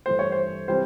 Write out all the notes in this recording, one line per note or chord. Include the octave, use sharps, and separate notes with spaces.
G2 E3 A3 C5
C#5
C5
C3 E3 G3 C5